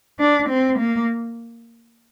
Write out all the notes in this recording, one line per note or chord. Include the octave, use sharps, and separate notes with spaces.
D4
C4
A#3